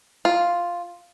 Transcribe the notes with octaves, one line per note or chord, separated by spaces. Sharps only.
F4